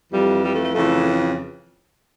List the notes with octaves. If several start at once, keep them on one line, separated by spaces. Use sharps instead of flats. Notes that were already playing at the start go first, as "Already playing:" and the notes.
F2 E3 G3
G3
A3
A3
F2 C#3 E3 A3